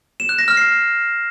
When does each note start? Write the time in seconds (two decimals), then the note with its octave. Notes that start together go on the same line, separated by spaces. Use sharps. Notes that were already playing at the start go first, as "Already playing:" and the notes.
0.20 E7
0.29 F#6
0.39 A#6
0.48 F6
0.57 C7